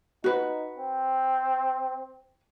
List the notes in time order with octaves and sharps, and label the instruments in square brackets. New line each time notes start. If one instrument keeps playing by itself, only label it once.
[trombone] D#4 [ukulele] F#4 B4
[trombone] C4